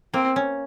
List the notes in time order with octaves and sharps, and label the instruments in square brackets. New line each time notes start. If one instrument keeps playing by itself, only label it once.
[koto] A#3 [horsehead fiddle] C4
[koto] C#4